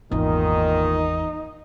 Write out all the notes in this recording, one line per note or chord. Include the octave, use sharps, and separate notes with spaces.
G#1 E2 A#2 D#3 D#4